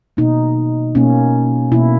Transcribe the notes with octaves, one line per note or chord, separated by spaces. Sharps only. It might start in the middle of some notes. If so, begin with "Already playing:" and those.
B2 A#3 D#4
B2 A#3 C#4
B2 A#3 E4